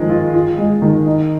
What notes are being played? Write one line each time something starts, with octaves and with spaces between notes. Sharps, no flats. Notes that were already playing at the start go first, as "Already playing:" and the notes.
Already playing: D#3 F3 G#3
F4
F4
G#3
D#3
D#4